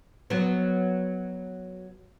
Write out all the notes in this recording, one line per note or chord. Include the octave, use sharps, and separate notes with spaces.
F#3 B3